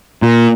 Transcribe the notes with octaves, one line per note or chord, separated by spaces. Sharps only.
A#2